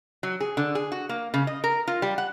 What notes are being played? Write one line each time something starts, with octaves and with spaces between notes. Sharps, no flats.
F#3
G#4
D3
G#4
F#4
A#3
C#3
D#5
A#4
F4
G3
F#5